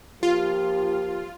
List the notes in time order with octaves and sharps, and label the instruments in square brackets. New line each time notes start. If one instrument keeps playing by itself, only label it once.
[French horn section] F3 A#3 G4 [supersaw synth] F4